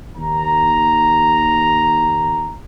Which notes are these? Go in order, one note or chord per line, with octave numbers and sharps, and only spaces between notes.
D#2 A#5